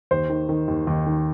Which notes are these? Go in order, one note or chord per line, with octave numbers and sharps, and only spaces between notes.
D#2 C5
D#3
D#3
D#2
D#2
D#3